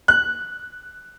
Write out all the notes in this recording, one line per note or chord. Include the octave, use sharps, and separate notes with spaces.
F#6